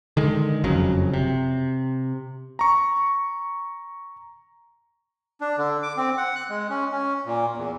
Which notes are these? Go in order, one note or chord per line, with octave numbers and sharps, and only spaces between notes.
D3 D#3 G#3
F#1 F2 C#3 F#3
C3
A#5 C#6
D4
D3
D6
C4
F#5
F#6
G#3
C#4
C#4
A#2
E2